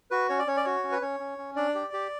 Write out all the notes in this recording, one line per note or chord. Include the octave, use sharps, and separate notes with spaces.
F#4 B4
C#4 C#5
D5
C#4 C#5
D5
F#4 C#5
C#4
B4
C#4 C#5
C#4
C#4
D4 D5
G4
G4